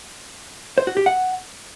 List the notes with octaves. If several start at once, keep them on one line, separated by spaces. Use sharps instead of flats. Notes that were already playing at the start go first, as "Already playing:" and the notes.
C5
F#4
G4
F#5